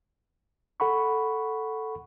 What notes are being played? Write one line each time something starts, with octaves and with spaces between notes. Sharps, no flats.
A4 F#5 B5 C#6